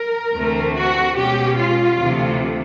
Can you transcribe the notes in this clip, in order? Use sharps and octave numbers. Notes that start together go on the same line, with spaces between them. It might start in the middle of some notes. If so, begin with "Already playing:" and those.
Already playing: A#4
D2 C3 E3 A3 C4
F#4
B2 G#3 C#4 G4
F4
D2 C3 E3 A3